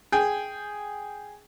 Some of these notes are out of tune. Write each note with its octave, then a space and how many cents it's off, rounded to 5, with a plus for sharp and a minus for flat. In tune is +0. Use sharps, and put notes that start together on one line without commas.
G#4 +0 G5 +0